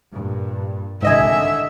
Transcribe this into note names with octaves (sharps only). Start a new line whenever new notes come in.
G2 A#2
C2 G#2 D3 D#3 D#5 E5 G#5